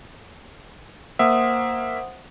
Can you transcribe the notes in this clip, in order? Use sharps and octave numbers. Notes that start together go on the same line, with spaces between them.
A#3 C5 E5 F#5 D#6